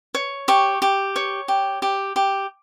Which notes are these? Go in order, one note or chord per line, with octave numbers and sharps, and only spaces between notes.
C#5
G4 C#6
G4
C#5
G4
G4
G4